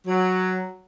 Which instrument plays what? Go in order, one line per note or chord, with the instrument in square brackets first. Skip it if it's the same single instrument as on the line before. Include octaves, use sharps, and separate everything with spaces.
[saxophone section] F#3